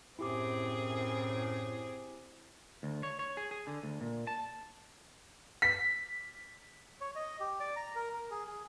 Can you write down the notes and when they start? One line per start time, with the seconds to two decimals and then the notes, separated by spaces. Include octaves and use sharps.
0.19 F#2 A2 C4 E4 G4 G#4 D6
2.83 D2
3.03 C#5
3.19 C#5
3.37 G#4
3.51 G#4
3.67 D3
3.83 D2
4.01 A#2
4.27 A5
5.62 B6
7.01 C#5
7.16 D#5
7.40 G4
7.60 D5
7.76 A#5
7.96 A#4
8.14 A#4
8.31 G#4
8.47 G#4